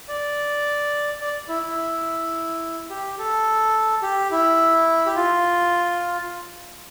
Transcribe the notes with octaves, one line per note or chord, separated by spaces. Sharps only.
D5
D5
E4
E4
G4
A4
G4
E4
G4
F4